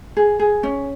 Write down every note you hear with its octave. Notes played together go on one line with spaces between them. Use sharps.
G#4
G#4
C#4